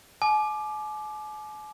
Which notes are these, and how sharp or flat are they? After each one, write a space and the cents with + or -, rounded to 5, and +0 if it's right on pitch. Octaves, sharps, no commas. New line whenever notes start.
G#5 +45 D6 +15